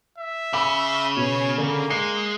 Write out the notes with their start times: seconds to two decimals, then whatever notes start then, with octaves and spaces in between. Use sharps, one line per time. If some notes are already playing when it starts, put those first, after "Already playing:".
0.18 E5
0.53 C#3 B5 D6 E6
1.17 B2 C#5
1.58 D3 A#3
1.90 G#3 C7